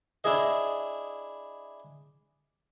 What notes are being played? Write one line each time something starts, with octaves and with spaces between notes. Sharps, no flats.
D4 E4 G#4 D#5